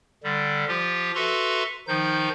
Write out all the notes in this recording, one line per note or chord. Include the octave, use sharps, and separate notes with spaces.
D3 G3
F3 F4 G4
F#4 A4 B4 E5 A#5 C6
D#3 F3 D#4 G6